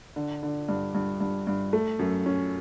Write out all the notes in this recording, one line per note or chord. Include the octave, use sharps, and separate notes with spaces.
D3
D3
G2
G2
G2
G2
A3
F#2
C#4